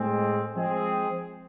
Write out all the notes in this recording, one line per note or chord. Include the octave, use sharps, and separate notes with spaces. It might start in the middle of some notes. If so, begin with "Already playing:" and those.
Already playing: A2 G#3 C4
F3 G#3 C4 G#4